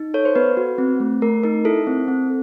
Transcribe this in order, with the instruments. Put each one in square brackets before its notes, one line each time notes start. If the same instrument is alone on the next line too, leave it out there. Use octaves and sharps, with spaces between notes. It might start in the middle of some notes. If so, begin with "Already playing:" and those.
Already playing: [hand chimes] D#4
A4 C#5
C5
B3 B4
F#4
C4
A3
A3 A#4
D#4 A#4
E4 A4
C4
C4